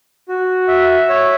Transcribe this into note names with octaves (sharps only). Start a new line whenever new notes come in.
F#4
E5
C#5